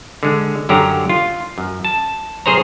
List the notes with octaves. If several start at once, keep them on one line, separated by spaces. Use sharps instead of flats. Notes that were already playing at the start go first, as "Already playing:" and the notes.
D3 G#3
F#2 D3 F#3 G4 A#5
F4
F#2
A5
B1 G#4 C5 C#5 A#5